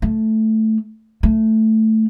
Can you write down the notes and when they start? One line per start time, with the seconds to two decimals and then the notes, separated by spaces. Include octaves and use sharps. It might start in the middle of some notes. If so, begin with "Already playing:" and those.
0.02 A3
1.23 A3